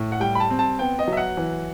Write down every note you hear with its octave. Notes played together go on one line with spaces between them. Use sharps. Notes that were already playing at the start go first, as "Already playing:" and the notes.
Already playing: A2
F#5
G3 G5
B5
A5
C4
A5
B3 G5
D#5
F#3
E5
F#5
E3